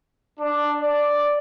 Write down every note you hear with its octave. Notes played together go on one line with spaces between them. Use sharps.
D4
D5